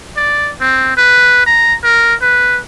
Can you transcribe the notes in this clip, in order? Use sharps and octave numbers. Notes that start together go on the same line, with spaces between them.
D5
C4
B4
A#5
A#4
B4